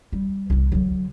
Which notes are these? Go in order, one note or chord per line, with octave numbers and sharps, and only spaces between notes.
G3
C2 B3
D3 F#3